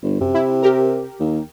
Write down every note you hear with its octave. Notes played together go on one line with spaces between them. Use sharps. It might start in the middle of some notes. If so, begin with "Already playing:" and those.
G1
F#2 C3
E4
G4 A#4
D#2